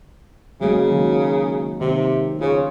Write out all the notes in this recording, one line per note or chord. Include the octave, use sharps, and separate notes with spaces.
C#3 F#3 G#3 A#3
D#3 F#3 A#3
C3 D#3
C#3 F4 C#5